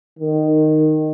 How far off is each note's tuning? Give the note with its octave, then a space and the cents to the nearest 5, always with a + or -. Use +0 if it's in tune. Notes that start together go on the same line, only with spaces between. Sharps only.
D#3 -10